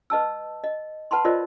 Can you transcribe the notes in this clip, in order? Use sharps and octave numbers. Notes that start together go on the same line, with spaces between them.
B4 D#5 A5 E6
D#5
B4 F#5 A5 B5 C6
F4 A#4 C5 D5 D#5